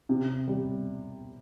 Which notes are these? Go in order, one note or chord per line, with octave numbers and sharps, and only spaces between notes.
C3
G3